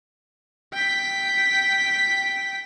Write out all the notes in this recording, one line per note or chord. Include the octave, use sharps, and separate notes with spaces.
G5 B6